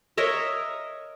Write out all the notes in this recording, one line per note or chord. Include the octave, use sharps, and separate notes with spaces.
A#4 C#5 D#5 E5